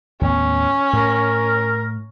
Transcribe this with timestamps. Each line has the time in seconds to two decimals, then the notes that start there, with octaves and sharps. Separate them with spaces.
0.21 D#2 A2 B3 C#4
0.93 A2 A#4